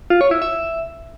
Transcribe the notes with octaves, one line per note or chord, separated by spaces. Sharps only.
F4
C#5
E4
E5